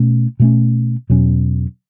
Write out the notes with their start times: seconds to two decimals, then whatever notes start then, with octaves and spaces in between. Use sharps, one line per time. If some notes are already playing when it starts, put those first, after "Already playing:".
Already playing: B2 A3 C#4
0.40 B2 A3 C#4
1.10 E2 B2 F#3 C#4